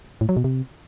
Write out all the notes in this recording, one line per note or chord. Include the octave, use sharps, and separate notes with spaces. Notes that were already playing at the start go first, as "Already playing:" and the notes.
A2
F#3
B2
C3